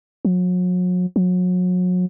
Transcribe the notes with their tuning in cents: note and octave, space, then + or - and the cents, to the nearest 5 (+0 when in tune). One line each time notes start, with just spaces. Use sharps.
F#3 -40
F#3 -35